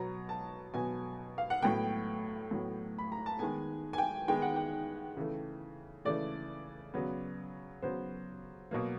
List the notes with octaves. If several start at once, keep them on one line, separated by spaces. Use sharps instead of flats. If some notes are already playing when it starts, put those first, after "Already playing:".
Already playing: B2 F#3 B3 A#5
A5
B2 F#3 B3 G#5
F5
F#5
A2 F#3 B3 G5
A2 F#3 B3
B5
A#5
A5
D#3 G#3 B3 G#5
G#5
G5
D#3 G#3 B3 G5
F#5
G5
C#3 E3 A3
C#3 E3 A3 D5
C#3 F#3 B3
C#3 F#3 B3 C5
B2 F#3 A#3